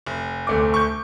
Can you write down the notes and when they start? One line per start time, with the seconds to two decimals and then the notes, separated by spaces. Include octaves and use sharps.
0.07 F1
0.47 D2 A3 D6
0.74 C#6 G6